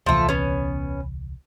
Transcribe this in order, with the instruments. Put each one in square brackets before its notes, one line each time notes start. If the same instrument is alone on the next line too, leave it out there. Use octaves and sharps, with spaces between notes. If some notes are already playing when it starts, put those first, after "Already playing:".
[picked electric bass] D#1 C2 E3 [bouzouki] F3 A3
[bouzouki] B3 C#4